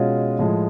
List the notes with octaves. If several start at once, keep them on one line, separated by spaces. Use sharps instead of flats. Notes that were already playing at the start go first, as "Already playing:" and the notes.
Already playing: B2 G#3 C#4 F4
A2 F3 G#3